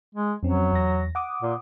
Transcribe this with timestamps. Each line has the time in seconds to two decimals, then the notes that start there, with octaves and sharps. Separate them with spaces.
0.15 G#3
0.43 F2 F#3 C4 C#4
0.72 E2 A#6
1.15 F#5 D6 D#6
1.42 A#2